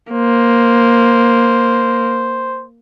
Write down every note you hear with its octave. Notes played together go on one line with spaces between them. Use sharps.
A#3 C5